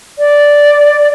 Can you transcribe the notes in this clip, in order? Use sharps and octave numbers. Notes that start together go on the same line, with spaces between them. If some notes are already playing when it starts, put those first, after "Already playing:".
D5